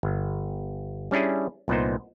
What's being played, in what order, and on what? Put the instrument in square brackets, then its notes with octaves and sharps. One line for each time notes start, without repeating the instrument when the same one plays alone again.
[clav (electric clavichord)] G1
G3 C#4 D4 E4 G#4
C2 A#2 B3 D#4 C5